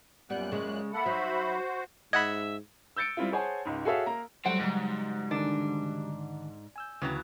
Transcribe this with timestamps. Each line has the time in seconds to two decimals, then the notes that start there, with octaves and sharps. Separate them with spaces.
0.30 F#2 A#2 G3 B3 F#6
0.52 C#3 G#3
0.93 A#3 A4 E5 F#5 B5
1.06 F#3 D#4 F#4 C5
2.13 G#2 D#5 E5 F#5 B5 G#6
2.96 E6 G6 A6 C#7 D7
3.17 G3 C4 E4 F4
3.32 G#4 C5 C#5 F#5 G#5 A5
3.65 C#2 G#2
3.85 F#4 G#4 A4 C#5 E5 F5
4.06 A#3 A#4 A#5
4.45 F#3 G3 A3 C4 F#5
4.60 G#2 C#3 F#3 G3
5.31 D3 D#3 D4
6.76 G#5 E6 G6
7.02 D2 C#3 E3 F#3 B4 G5